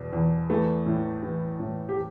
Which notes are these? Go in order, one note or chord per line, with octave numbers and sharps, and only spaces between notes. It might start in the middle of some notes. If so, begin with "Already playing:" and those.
Already playing: E2 B2
E2
E3 A3
A2
E3
A2
G4